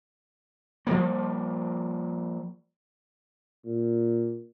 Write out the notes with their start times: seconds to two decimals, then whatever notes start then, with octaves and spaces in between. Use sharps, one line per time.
0.87 F3 G3 A#3
3.65 A#2